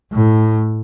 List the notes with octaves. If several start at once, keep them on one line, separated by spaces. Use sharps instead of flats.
A2